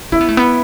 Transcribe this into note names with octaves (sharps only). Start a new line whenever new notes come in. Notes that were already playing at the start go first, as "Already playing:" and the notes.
C#4 E4
B3
A3
B3